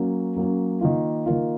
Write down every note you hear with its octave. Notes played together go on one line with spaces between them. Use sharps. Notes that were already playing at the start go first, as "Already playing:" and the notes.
Already playing: F#3 A#3 C#4
F#3 A#3 C#4
D#3 A#3 F4
D#3 A#3 F4